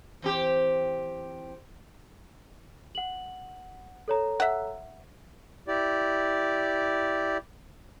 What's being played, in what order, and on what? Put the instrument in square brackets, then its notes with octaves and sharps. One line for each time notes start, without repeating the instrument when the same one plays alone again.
[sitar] E3 C4 G4
[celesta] F#5 F#7
A4 C#5 A#5
[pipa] E5 F#5
[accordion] E4 G4 D5